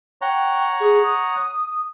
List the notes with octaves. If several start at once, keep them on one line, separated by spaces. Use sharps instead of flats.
C#5 F#5 G5 A#5
G#4
D#6